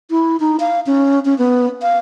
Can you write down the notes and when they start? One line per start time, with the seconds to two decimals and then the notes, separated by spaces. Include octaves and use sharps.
0.10 E4
0.40 D#4
0.60 F5
0.87 C#4
1.25 C#4
1.38 B3
1.82 F5